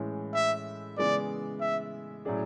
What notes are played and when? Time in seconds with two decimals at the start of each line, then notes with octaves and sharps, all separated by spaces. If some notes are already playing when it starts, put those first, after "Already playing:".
Already playing: A2 E3 G#3 C#4
0.34 E5
0.97 C#3 E3 G#3 B3 D5
1.61 E5
2.25 A2 F#3 C#4 G#4 D5